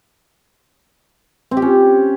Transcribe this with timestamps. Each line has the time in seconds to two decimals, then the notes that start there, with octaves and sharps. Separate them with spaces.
1.51 C4
1.57 G4
1.62 C#4